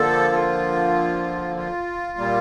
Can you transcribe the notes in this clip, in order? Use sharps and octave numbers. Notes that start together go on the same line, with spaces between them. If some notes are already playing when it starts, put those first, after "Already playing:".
Already playing: D3 F3 A#3 A4
F4
F4
A#2 G3 A#3